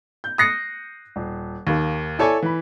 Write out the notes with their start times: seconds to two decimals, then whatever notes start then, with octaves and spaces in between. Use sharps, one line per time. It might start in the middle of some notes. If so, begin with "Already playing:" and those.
0.24 G6
0.38 D#6 F#6 A#6 C7 C#7
1.16 D#1
1.67 D#2 A#3
2.19 E4 A4 C#5 D5 G#5
2.42 E3 B5